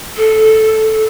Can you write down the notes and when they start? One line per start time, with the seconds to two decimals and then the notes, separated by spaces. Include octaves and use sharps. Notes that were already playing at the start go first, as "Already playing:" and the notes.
0.17 A4